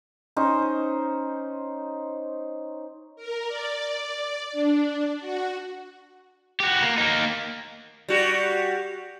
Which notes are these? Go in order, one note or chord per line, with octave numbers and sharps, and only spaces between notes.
C#4 D#4 C5
A#4
D5
D5
D4
F#4
F#4 G4
A#3
A#3 D#4
G3 F#4